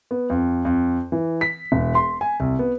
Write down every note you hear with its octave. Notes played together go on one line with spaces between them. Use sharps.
B3
F2
F2
E3
B6
E1
C6
G#5
C2
B3